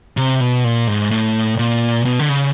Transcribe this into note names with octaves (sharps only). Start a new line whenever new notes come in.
C3
B2
A#2
G#2
A2
A#2
B2
D3
C#3